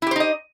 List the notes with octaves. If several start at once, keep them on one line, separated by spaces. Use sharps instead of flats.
D#4 E4 G4 C5 D#5